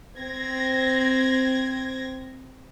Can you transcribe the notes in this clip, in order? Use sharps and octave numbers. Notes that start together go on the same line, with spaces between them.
C4 G#6 A#6